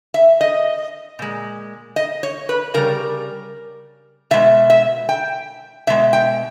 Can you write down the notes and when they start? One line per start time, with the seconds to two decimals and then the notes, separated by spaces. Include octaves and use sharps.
0.14 E5
0.41 D#5
1.19 A#2 G#3
1.96 D#5
2.23 C#5
2.49 B4
2.74 C#3 G3 A#4
4.31 B2 G#3 E5
4.70 E5
5.09 G5
5.87 B2 G#3 E5
6.13 G5